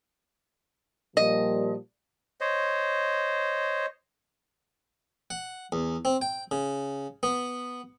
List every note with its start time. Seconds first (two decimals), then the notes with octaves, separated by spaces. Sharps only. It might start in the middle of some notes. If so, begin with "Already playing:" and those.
1.17 A#2 F3 G3 D#5
2.41 C5 C#5 D#5
5.30 F#5
5.72 E2
6.05 C4
6.22 G5
6.51 C#3
7.23 B3